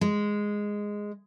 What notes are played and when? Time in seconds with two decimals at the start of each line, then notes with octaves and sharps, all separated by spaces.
0.01 G#3